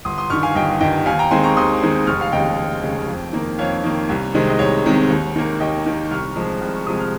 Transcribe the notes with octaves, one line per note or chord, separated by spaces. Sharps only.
G1 C6 D#6
C6 D#6
G2 D#3 C#6 F6
F5 G#5
G1 D#5 G5
G2 D#3 D#5 G5
D#2 F5 G#5
G5 A#5
D#3 G#3 C4 G#5 C6
A#5 C#6
D#2 C6 D#6
D#3 G#3 C4
F1 C#6 F6
F5
D#2 C#3 G#3 D#5 G5
F1
D#2 C#3 G#3
F2
D#3 A#3
F2 C#5 F5
D#3 A#3
C2
C3 D#3 G#3 C4
D#5
C2 C#5
C3 D#3 G#3 C4
D#2
D#3 A#3
D#2 D#5 G5
D#3 A#3
C2 C#6 F6
C3 F3 G#3
C2
C#6
C3 F3 G#3 D#6
F6